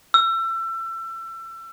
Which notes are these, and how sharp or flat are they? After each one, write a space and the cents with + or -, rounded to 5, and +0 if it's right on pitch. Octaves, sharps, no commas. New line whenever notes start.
E6 +30